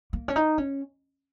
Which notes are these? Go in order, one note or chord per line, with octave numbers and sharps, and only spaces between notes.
A#3
C#4
D#4
C#4